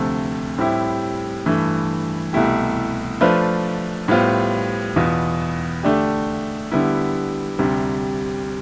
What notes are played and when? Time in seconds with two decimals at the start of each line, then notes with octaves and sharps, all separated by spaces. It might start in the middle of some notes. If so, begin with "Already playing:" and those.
Already playing: D2 C3 F3 A3
0.58 A2 G3 C4 E4 G4
1.46 G2 E3 A3
2.33 C2 B2 A3 E4 G4
3.21 F3 A3 D4 F4 B4
4.08 A2 G3 B3 F4 C5
4.96 E2 B2 B3 F4
5.83 D3 A3 D4 G4
6.71 D3 G3 B3 E4
7.59 D2 C3 G3